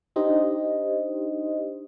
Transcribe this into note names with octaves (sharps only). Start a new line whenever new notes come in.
D4 D#4 G4 C5 D#5